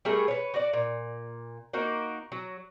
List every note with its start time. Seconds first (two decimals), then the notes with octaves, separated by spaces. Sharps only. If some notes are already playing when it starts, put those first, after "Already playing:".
0.05 G3 A3 G#4 A#4
0.28 B4 C#5
0.54 F#4 D5
0.73 A#2
1.73 A#3 D#4 F#4 A#4
2.32 F#3